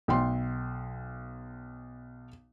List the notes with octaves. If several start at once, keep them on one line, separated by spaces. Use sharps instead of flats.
B1 G5 C6